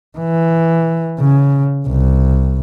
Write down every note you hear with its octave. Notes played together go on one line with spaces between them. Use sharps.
E3
C#3
C2